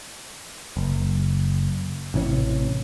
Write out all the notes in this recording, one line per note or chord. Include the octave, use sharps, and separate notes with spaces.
F#1
A1 C3 E3 C#4